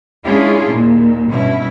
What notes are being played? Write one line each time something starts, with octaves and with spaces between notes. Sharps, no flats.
G#3 C#4 D4 E4 F4 G#4
D#2 A#2
G2 B2 C#4 E4